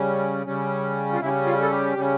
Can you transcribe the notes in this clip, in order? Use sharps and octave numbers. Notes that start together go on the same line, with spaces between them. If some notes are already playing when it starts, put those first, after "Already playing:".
Already playing: C#3 G3 C#4
C#3 G3 C#4
F4
C#3 G3 C#4 E4
F4
A4
G4
C#3 G3 C#4